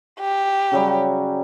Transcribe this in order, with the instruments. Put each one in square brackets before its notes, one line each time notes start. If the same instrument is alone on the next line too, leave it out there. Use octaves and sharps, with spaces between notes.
[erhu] G4
[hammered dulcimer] C#3 F#3 G3